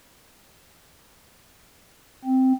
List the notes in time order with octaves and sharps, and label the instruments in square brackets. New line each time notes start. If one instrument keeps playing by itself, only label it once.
[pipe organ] C4